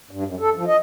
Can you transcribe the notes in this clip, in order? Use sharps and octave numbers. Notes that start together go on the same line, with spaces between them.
G2
F#2
A4
F3
D#5